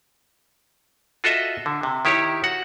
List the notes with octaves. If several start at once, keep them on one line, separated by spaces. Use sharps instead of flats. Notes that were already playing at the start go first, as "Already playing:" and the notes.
F4 F#4 A4 D#5 E5
D3
C3
D#3 E4 G4 C#5
F#4 F#5